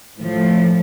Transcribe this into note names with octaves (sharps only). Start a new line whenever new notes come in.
A2 F3 A3